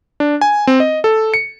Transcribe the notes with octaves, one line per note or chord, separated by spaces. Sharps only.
D4
G#5
C4
D#5
A4
C#7